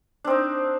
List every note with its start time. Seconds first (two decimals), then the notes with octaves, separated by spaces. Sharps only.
0.24 D4
0.27 C4
0.30 D#4